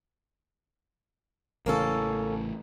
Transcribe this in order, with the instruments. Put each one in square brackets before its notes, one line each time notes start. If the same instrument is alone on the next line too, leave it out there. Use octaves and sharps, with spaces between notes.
[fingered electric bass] A1 C#3 E3 [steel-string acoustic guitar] A#3 C#4 A4